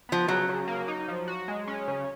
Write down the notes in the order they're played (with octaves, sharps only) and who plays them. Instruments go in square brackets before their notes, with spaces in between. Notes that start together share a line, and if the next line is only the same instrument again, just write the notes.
[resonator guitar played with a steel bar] F3 [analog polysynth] B3
[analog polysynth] C#3 [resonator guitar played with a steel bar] F#3
[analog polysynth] C#3
A#3
D#4
F3
F#4
G#3
C#4
C#3